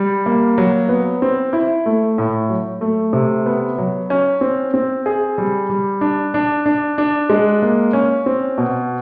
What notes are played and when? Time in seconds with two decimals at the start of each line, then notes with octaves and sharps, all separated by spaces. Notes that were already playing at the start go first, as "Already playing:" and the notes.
Already playing: G3
0.26 A#3
0.58 F#3
0.89 B3
1.22 C4
1.53 E4
1.86 A3
2.18 A2
2.49 F#3
2.81 A3
3.13 C3
3.46 B3
3.78 F#3
4.10 C#4
4.41 C4
4.74 C4
5.06 G#4
5.38 G3
5.69 G3
6.01 D4
6.34 D4
6.66 D4
6.98 D4
7.30 G#3
7.62 A#3
7.93 C#4
8.26 C4
8.58 B2